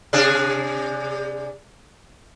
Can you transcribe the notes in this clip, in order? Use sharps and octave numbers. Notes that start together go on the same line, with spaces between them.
C3 D4 G#4